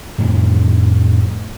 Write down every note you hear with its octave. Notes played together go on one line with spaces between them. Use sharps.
F2 A2 D3 D#3